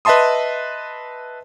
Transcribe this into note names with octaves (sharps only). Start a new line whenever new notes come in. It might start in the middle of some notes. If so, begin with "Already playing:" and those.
B4 D#5 E5 A5 C6 D#6